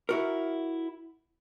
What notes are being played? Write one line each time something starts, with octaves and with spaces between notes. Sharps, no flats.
E4 F#4 A#4